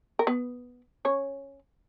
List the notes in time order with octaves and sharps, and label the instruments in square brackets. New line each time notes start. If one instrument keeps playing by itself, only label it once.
[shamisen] A#4
B3 B4
C#4 C#5